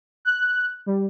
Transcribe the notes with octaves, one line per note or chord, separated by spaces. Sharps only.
F#6
G3